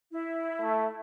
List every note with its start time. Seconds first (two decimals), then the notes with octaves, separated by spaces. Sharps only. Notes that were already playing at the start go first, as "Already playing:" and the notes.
0.12 E4
0.62 A3